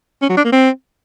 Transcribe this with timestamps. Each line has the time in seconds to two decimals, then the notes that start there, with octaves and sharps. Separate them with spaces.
0.22 C#4
0.29 F#3
0.37 D4
0.45 A#3
0.52 C4